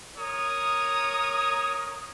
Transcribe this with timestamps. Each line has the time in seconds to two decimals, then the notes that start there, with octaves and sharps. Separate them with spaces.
0.17 A#4 C#5 D#6